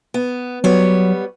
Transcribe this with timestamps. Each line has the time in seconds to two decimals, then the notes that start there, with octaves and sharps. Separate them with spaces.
0.14 B3
0.64 F#3 G3 B3 C#5